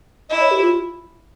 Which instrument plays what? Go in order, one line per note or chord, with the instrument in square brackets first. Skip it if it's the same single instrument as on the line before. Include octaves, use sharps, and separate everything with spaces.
[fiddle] E4 [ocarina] D#5
[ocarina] C#5
G4
F4